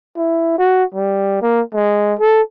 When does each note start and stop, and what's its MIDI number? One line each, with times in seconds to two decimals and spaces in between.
0.17 0.56 64
0.59 0.84 66
0.94 1.38 55
1.42 1.62 58
1.74 2.14 56
2.19 2.42 69